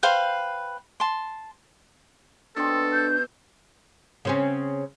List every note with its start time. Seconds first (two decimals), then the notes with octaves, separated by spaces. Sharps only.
0.03 B4 C5 F5 G5
1.00 A5 C6
2.56 B2 C4 D4 A4
2.93 G6
4.25 C#3 C4 C#4